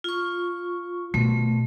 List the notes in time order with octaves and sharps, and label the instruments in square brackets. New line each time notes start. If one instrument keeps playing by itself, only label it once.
[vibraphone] F4 C#6
[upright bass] B2 [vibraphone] A3